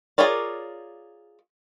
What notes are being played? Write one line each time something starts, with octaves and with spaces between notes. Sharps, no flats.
F4 G#4 A#4 C#5 D5